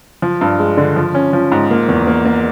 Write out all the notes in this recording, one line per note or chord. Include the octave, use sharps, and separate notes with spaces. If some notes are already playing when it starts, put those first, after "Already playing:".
F3
G2
G#3
D3
F3
C#4
F3
G#2
A#3
E2
A#3
A#3